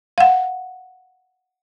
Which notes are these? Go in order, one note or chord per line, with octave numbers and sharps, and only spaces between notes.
F5 F#5